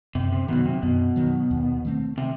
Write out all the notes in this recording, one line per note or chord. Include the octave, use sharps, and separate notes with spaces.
F#2 C3
C3
B2 D#3 F#3
C3
F#2 B2
D#3 F#3
D#2
D#3 A3 C4
C3